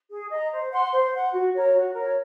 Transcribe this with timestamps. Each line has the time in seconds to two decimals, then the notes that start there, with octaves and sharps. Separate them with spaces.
0.10 G#4
0.31 D#5 A#5
0.52 C5
0.72 F#5 C6
0.93 C5
1.12 F#5 C6
1.33 F#4
1.54 A#4 C#5
1.74 F#4
1.94 A#4 C#5